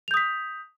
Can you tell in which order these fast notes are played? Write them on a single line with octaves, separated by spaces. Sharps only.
F7 G6 D#6 B6